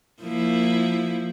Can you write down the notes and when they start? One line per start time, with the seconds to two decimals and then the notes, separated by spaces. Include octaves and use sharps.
0.22 F3 A#3 E4